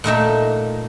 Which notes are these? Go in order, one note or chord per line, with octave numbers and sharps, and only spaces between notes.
A#2 A3 D#4 E5